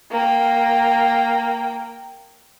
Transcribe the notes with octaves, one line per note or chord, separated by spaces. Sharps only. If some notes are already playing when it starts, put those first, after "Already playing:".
A#3 G5